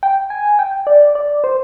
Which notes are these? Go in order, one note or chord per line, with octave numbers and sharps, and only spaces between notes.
G5
G#5
G5
D5
D5
C5